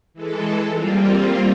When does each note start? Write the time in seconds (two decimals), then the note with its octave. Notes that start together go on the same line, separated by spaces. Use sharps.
0.14 E3 G#3 A4
0.72 G3 A#3 C4 F4